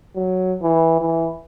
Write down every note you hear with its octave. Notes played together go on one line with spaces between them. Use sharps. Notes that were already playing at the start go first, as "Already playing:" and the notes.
F#3
E3
E3